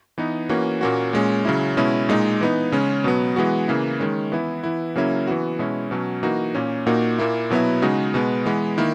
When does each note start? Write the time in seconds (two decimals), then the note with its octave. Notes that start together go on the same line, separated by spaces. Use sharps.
0.18 E3 B3 D#4
0.49 E3 A#3 C#4 F#4
0.81 A#2 A#3 C#4 F#4
1.13 A#2 G#3 C#4
1.45 C#3 F#3 C#4 E4
1.77 B2 G#3 C#4 E4
2.09 A#2 G#3 D#4
2.41 E3 B3 D#4
2.72 C#3 G#3 C#4
3.04 B2 F#3 B3
3.36 E3 G#3 B3 F#4
3.68 C#3 E3 A#3 E4
4.00 D#3 G#3 C#4
4.32 E3 B3 E4
4.63 E3 B3 E4
4.95 C#3 F#3 A#3 C#4 E4
5.27 E3 B3 F#4
5.59 B2 G#3 C#4 E4
5.91 B2 F#3 C#4
6.23 E3 A#3 D#4 F#4
6.55 A#2 A#3 C#4
6.87 A#2 A#3 D#4 F#4
7.19 A#2 A#3 E4
7.50 B2 F#3 B3 E4
7.82 C#3 G#3 D#4 F#4
8.14 B2 G#3 B3
8.46 E3 G#3 B3
8.78 D#3 A#3 E4